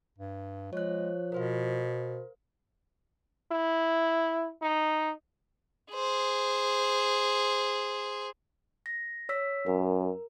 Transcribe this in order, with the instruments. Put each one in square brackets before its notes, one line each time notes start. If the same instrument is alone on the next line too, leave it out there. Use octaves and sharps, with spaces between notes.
[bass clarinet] G2
[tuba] F3 [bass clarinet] G#3 [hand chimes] C#5 F#6
[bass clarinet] B2 [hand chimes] A#4 C5 F5
[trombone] E4
D#4
[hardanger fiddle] G#4 C5
[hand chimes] A#6
C#5 E6 B6
[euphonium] F#2 [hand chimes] A#4